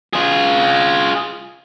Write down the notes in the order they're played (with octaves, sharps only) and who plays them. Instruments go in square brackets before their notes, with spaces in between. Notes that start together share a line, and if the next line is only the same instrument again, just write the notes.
[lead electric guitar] F4 G#4